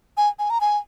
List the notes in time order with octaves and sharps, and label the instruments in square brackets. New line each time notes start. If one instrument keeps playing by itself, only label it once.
[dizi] G#5
G#5
A#5
G#5